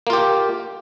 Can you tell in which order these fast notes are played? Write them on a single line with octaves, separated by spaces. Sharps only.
A#3 F4 G4